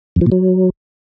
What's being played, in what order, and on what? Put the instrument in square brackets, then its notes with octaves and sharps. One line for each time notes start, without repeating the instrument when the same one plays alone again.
[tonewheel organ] F2
F3
A#2
F#3